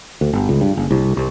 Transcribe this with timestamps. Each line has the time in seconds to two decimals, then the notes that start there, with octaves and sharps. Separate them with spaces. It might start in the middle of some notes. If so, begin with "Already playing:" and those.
0.21 D2
0.33 G1
0.49 C#2
0.61 G2
0.77 F#1
0.91 C2
1.17 C2